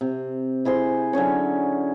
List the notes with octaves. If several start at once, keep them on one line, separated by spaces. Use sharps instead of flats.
C3
E4 G#4 C5 C6
D3 F#3 C#4 C#5